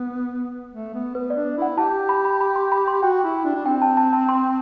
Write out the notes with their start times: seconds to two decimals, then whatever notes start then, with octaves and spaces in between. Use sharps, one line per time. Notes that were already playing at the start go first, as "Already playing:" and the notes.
Already playing: B3
0.73 A3
0.94 B3
1.15 B3 B4
1.30 D5
1.36 D4
1.57 E4 F#5
1.78 G4 A5
2.09 B5
2.25 B5
2.41 B5
2.56 C6
2.72 B5
2.88 C6
3.02 F#4 G5
3.24 E4
3.45 D4
3.55 D4
3.66 C4 G5
3.82 A5
3.97 A5
4.13 A5
4.29 C6